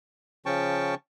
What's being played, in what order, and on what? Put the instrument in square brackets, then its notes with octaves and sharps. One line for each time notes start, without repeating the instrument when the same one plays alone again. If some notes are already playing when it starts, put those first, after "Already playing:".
[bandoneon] C#3 F3 C#4 G5 A5 C#6